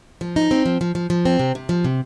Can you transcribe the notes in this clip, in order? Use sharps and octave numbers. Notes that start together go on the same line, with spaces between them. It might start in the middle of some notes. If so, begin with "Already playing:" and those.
F3
D#4
C4
F3
F3
F3
F3
C4
C3
C3
F3
C3